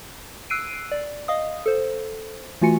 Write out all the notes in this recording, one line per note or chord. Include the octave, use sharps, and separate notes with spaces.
E6 F#6 C7 D7 D#7
D5
D#5 F5 D#6
A4 C5
E3 A3 F4 F#4 G#5 C#7